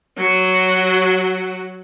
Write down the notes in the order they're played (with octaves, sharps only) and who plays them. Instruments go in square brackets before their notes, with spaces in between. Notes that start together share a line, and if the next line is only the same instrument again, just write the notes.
[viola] F#3 F#4